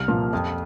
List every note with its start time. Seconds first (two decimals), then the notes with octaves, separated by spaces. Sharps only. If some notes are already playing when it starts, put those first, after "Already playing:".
Already playing: C2 F6
0.08 A#2 F3
0.33 F2